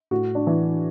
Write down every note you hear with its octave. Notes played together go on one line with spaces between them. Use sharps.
A2 F#4
D4
E3